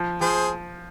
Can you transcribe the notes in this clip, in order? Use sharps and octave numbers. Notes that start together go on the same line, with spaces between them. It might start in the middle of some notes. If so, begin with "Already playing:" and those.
Already playing: F3
F3 G#4 C5